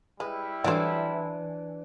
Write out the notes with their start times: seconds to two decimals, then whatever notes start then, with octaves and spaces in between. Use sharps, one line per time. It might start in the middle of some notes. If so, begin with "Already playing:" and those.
0.20 G3 G#3 E4 B4
0.64 D3 E3 F#3 D4 C5 G5